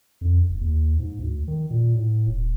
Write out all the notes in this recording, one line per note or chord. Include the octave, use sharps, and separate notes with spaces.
F2
F#1
D#2
G#2
D2
D#3
A#2
A2
D#1